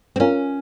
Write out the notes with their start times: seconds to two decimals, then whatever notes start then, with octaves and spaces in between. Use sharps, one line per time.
0.16 C4
0.20 C#4 F4 A#4 C#5 F5 G#5